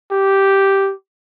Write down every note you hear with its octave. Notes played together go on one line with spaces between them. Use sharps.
G4